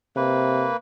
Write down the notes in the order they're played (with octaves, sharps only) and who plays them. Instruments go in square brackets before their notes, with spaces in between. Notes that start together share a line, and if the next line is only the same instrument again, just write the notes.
[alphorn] C3 [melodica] A#3 B4